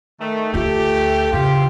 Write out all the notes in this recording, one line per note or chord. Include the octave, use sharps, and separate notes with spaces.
D#3 A3
D2 A3 F4 G4
E2 C#3 F4 G4